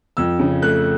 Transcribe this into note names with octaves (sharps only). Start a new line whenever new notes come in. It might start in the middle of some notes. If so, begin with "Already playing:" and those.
F2 E6
C#3
A3 F#6